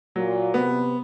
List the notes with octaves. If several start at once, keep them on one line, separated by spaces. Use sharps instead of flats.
A#2 F#3
C3 B3